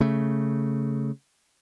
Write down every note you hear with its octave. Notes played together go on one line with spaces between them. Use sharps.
C#3 A3